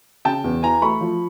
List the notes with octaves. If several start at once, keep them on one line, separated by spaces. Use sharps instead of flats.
C#3 G5 A5
E2
E3 G#5 A#5
A3 B5 C#6
F3